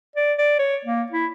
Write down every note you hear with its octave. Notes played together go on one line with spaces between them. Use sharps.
D5
D5
C#5
A#3
E4